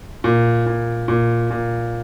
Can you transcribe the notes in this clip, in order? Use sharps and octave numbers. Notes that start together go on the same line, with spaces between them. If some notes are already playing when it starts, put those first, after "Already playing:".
A#2
A#2
A#2
A#2